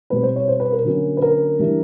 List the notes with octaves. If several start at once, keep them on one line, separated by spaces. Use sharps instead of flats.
B2 G3 C4 B4
C5
C#5
C5
B4
A#4
D3 F#3 A#3 C#4
B4
A#4
E3 G3 A#3 D4